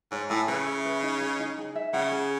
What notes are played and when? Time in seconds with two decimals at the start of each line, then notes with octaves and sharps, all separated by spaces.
0.11 G#2 C#5
0.30 A2 G#5
0.48 C#3 B4
0.67 E5
0.85 B4
1.03 D#4
1.22 G#4
1.39 D#4
1.58 G#4
1.75 E5
1.94 C#3 F#5
2.12 G#4